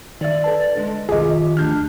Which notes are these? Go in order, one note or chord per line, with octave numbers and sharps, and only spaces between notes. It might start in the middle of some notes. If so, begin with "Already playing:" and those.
D#3 D5 E5
A4 B4 A5
D3 G#3
D#3 F3 F4 G4 G#4 D#5
G1 D2 D4 F6 G6 A6